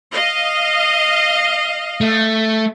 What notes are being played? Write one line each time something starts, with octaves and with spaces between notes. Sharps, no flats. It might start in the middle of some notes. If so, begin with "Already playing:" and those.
D#5 F5
A3